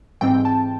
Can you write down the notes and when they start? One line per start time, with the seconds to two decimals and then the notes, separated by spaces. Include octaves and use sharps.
0.21 G#2 E3 G3 C4 G5
0.45 A5